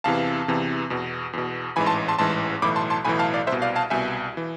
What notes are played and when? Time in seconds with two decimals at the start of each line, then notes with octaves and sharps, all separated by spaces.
0.04 E2 C3 E3 F5 A5
0.48 E2 C3 E3
0.90 E2 B2
1.33 E2 B2
1.76 A1 G#2 E3 G#5 B5
1.86 A5 C6
2.08 A5 C6
2.19 A1 G#2 E3 A5 C6
2.62 B1 A2 E3 B5 D6
2.76 A5 C6
2.90 A5 C6
3.05 B1 A2 E3 G#5 B5
3.19 F5 A5
3.34 D5 F5
3.47 C2 C5 E5
3.52 B2
3.62 D5 F5
3.76 F5 A5
3.90 C2 B2 E5 G#5
4.37 E3